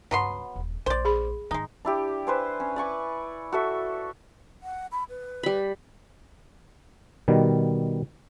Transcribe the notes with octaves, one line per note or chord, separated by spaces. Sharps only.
C#2 G2 F#3 B3 C6
D#1
A#1 C5 D5
G#4 B5
G#2 D#3 G#3 D#4
D4 E4 G4
B4 C5 G#5
C#4
D5 G#5 C#6 D6
F#4 A4 E5
F#5
B5
B4
G3 B5
B2 D#3 G3